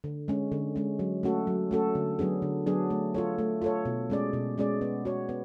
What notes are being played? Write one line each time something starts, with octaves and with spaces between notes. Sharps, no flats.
D3
G#3 C#4
D3
G#3 C#4
F#3
A3 C#4 F#4 A4
F#3
A3 C#4 F#4 A4
D3
F#3 B3 D4 G#4
D3
F#3 B3 D4 G#4
A3
F4 A4 C#5
A3
F4 A4 C#5
B2
G#3 C#4 G#4 D5
B2
G#3 C#4 G#4 D5
B3
F#4 C#5
B3